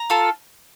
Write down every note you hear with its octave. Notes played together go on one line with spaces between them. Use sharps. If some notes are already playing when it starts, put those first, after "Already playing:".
Already playing: A#5
F4 A4